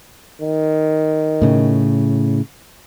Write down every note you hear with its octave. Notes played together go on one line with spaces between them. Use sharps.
D#3
A2 C#3